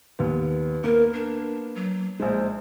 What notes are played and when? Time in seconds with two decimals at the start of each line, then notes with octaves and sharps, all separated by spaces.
0.19 D#2 B3
0.84 A#3 B3 A#4
1.13 D4
1.75 F#3
2.20 A#1 G#3 C5